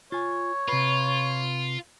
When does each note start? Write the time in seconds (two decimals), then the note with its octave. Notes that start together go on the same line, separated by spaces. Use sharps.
0.12 F4 C#5 G#5
0.68 C3 F4 B4